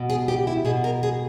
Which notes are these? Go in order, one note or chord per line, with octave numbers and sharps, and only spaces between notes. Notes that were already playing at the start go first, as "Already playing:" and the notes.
Already playing: B2
G#4
G4
E4
B2 G#4
A#4
G#4